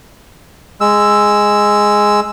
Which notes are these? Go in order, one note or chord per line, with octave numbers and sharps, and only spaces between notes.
G#3 E6